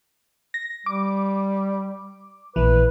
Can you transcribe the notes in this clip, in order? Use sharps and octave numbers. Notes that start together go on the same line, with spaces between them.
A#6
G3 D6
A#1 E3 B4